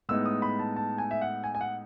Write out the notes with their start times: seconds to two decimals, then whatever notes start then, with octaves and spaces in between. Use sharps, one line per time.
0.09 A2 G#3 B3 D#4 E6
0.26 D#6
0.42 B5
0.59 A5
0.76 A5
0.98 G#5
1.11 E5
1.21 F#5
1.44 G#5
1.55 G#5
1.61 F#5